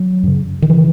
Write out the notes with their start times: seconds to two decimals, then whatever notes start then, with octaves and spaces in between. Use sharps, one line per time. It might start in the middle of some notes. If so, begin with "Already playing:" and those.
Already playing: F#3
0.23 F#2 C#3
0.62 D#3
0.70 C#3 E3